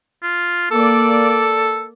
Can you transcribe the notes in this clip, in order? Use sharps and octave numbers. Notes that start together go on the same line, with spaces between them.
F4
A#3 A4 D5